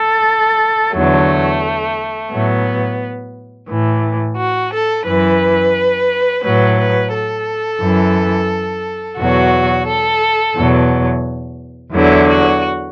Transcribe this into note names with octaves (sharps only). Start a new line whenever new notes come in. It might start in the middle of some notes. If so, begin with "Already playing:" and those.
Already playing: A4
E2 D3 F#3 A3
A2 F#3 B3
A2 E3
F#4
A4
F#2 E3 B4
A2 F#3 B4
B4
A4
F#2 E3
E2 B2 F#3 F#4
A4
E2 B2 F#3
E2 D3 F#3 E4
F#4